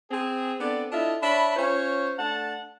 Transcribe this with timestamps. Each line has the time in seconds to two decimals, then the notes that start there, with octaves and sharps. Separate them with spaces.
0.11 C4 G#4
0.61 B3 C4 D4 A4 D5
0.92 D4 E4 F4 A4 D#5 E5
1.22 D4 C#5 E5 B5
1.57 C#4 F4 C5 C#5
2.19 A3 D4 F#5 A5